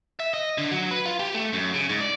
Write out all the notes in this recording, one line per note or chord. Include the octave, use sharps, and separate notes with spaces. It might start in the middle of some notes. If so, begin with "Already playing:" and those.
E5
D#5
D3
F#3
B4
F4
G4
A3
F#2
C#3
G#2
D5